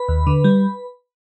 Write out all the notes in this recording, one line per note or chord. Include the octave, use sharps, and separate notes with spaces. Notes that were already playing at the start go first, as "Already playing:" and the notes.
Already playing: B4 B5
D#2
D3
G3